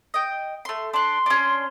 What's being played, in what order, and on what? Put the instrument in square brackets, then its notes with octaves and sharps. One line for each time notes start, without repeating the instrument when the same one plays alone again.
[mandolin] D#5 G5
A3 C6
[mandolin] D4 F#6 [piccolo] C6
[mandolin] C#4 D4